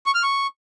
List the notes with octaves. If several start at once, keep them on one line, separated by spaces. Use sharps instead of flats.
C#6
F6
C#6